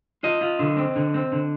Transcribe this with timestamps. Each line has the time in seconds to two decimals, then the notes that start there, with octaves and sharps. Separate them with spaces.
0.23 F4 D#5
0.41 F4
0.59 D3
0.77 C4
0.96 D3
1.14 C4
1.32 D3